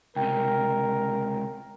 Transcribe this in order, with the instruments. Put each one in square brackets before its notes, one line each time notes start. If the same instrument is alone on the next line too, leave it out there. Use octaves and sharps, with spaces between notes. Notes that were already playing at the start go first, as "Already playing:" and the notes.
[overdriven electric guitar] C#2 C3 [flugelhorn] A#4 [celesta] G5